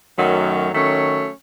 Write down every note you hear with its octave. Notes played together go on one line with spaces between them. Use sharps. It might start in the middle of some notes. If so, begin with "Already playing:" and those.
F#2 D#3 F#3 A3
D#3 F#3 A3 C#4